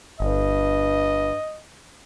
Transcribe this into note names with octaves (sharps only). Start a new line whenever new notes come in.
G1 G2 D#5